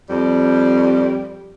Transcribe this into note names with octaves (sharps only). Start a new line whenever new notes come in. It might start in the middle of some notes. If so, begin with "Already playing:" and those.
F2 G3